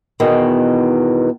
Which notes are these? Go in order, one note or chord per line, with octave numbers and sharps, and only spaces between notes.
E2 B2 D#3